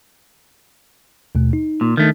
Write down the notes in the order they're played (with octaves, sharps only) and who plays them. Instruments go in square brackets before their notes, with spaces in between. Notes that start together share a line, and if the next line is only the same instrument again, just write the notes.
[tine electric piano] D#2 B2 A3
D#4
[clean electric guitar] A#2
[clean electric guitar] D#3 A3 [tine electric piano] D4